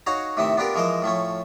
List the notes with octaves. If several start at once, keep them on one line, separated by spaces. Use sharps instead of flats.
D#4 F#4 C#5 F5 A#5
A2 C3 D#3 C4 D#4 E5
B3 D4 F4 G4 A#4
E3 F3 G#3 A#4 C5 D#5
A2 F3 A3 C#4